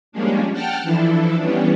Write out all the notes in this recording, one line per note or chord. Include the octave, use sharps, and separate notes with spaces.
F3 G3 G#3 A#3 C#4 D4
F#5 G5 A5 F6
E3 F3 D4 E4 A4
E3 G3 B3 C#4 D4